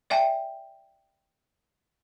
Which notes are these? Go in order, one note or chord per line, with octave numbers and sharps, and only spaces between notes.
D5 E5 G5 G#5